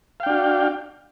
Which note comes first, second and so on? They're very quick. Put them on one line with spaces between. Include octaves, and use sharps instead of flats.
F5 G5 D4 F#4